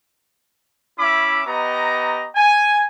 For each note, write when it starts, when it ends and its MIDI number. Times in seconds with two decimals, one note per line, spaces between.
0.99 1.42 61
0.99 1.42 64
0.99 1.42 76
0.99 1.42 83
0.99 1.42 86
1.47 2.26 59
1.47 2.26 67
1.47 2.26 75
1.47 2.26 82
2.36 2.86 80